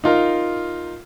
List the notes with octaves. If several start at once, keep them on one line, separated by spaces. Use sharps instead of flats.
D#4 F4 A#4